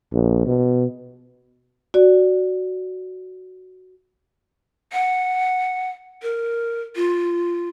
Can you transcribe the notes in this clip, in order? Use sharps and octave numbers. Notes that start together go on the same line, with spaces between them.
A#1
B2
F#4 D5
F#5
A#4
F4